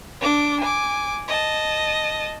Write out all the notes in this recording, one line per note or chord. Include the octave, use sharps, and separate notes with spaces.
D4 D6
G#5 D6
D#5 A5